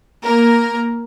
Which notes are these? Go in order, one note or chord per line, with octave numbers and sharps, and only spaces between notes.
A#3 A#4